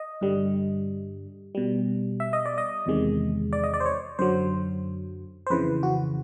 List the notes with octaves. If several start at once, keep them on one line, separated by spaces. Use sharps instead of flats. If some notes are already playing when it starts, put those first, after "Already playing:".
Already playing: D#5
G2 D3 G3
B2 G3
E5
D#5
D5
D#5
E2 C3 D#3 G#3
D5
D#5
D5
C5
C#5
F#2 D3 F#3 C5
C5
F2 C#3 E3 B4
F#4